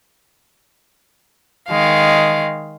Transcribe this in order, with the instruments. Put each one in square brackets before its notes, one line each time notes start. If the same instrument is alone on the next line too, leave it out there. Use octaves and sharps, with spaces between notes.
[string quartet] D#3 G#3 F5